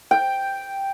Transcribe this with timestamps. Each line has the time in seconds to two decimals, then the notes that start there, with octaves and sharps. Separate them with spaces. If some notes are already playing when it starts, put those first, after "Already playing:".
0.11 G5